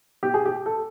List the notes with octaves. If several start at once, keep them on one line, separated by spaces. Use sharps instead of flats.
B2 G4
G#4
G4
A4